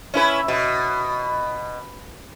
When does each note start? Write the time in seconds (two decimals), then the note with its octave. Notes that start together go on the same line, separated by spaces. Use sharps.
0.14 C#4 E4 B4
0.48 B2